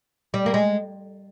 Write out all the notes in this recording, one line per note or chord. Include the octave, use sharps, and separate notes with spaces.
G3
A#3
G#3